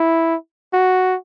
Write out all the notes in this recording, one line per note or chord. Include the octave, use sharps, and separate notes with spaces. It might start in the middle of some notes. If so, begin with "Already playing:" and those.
Already playing: E4
F#4